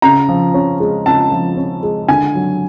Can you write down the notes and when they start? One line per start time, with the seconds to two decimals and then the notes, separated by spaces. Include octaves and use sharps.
0.02 C#3 A#5
0.29 F3
0.54 C#4
0.80 G#3
1.06 C#3 A5
1.32 F3
1.57 C#4
1.83 G#3
2.08 D3 G#5
2.35 F#3